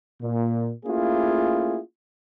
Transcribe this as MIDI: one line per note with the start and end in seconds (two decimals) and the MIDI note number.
0.21 0.70 46
0.85 1.79 57
0.85 1.79 58
0.85 1.79 61
0.85 1.79 64
0.85 1.79 65
0.85 1.79 68